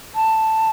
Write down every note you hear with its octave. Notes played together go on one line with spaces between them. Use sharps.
A5